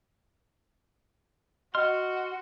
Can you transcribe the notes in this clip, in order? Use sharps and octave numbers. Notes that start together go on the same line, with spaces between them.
F#4 D#5 F#5 C6 F6